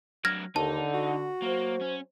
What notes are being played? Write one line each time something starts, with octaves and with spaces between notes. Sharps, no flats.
F#3 D4 F6 G#6 A#6
D#2 D3 D#4 A5
F#4
F#3 A#3 C5
C#4